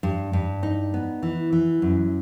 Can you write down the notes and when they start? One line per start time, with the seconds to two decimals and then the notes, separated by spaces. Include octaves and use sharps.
0.03 G2
0.33 G2
0.63 D#4
0.94 B3
1.23 E3
1.53 E3
1.82 F#2